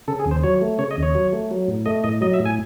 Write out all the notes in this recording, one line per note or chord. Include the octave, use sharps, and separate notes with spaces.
C#3 A4
G#4
D#2
C5
F#3 C#5
A3
C#3 C#5
D#5
D#2
C#5
F#3
A3
F#3
A2
A3 D#5
A2 D#5
F#3 D#5
E5
A2
G#5